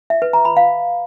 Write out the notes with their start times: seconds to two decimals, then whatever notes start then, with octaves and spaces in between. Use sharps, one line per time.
0.10 E5
0.22 B4
0.33 A#5
0.45 B5
0.57 F5